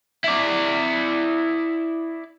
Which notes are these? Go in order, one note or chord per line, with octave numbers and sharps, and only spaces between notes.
E4 D5